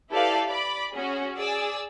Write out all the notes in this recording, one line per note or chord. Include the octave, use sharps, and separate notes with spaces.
E4 G4 A4 B4 D5 F5
D5 B5 D6
C#4 F#4 G#4
G#4 D5 E6